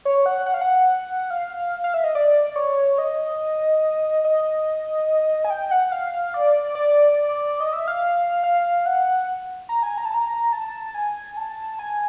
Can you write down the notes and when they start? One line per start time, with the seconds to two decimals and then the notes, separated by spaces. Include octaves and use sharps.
0.05 C#5
0.26 F#5
0.46 F#5
0.54 F5
0.61 F#5
1.31 F5
1.84 F5
1.94 E5
2.04 D#5
2.15 D5
2.56 C#5
2.98 D#5
4.24 D#5
5.45 G#5
5.50 G5
5.71 F#5
5.92 F5
6.34 D5
6.75 D5
7.60 D#5
7.73 E5
7.88 F5
8.43 F5
8.86 F#5
9.69 A#5
9.83 G#5
9.98 A#5
10.05 A5
10.14 A#5
10.53 A5
10.94 G#5
11.37 A5
11.79 G#5